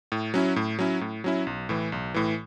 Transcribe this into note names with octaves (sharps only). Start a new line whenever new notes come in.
A2
F#3 C#4 E4
A2
F#3 C#4 E4
A2
F#3 C#4 E4
B1
A2 E3
B1
A2 E3